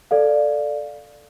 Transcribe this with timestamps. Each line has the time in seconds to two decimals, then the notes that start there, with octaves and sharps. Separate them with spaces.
0.11 A4 D5 F5